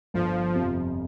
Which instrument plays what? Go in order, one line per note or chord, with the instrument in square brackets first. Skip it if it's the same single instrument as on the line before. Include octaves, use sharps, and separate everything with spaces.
[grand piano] G1 [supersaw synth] F3
[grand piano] F2 C3